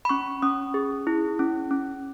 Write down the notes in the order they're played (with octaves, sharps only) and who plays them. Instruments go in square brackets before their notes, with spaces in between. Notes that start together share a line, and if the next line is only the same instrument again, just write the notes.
[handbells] B5
C#4 C#6
C#4 D#6
G#4
E4
C#4
C#4